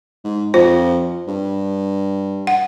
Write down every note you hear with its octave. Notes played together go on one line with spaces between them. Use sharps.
G#2
F2 F4 C5
G2
F#5